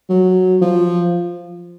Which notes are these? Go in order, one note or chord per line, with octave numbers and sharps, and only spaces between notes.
F#3
F3